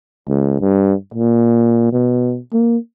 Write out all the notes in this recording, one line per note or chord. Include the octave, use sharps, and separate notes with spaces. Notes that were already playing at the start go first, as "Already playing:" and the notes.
C#2
G2
A#2
B2
A#3